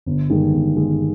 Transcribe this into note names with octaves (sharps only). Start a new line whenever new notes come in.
G1
G2 D#3 G#3
G1
G2 D#3 G#3